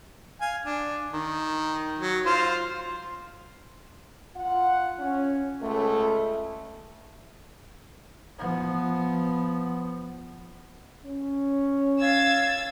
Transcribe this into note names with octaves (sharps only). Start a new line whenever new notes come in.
F5 G#5
D4
D#3
F#3
F4 C5
F4 F#5
C#4
C#2 A3
F3 B3
C#4
F5 E6 G#6 A6